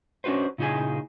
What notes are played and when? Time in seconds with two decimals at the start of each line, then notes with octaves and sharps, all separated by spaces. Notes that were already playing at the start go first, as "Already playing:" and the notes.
0.24 C#4 D4 F#4 B4 C5
0.58 A#2 C#3 D#4 E4 G#4 G#5